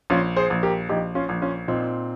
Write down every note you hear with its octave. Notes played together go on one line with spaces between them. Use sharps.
A#1 C#4 F4
G#4 C5
A#1
G4 A#4
A#1 D#4 G4
C#4 F4
A#1
C#4 F4
A#2 C4 D#4